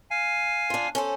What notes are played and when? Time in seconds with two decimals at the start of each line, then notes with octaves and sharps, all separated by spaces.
0.11 F5 G#5
0.70 D4 F4
0.95 C#4 A4 C5